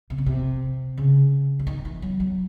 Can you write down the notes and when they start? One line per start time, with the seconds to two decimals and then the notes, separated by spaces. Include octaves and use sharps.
0.10 C3
0.18 C#3
0.26 C3
0.97 C#3
1.59 E3
1.67 D#3
1.85 E3
2.02 F#3
2.20 F#3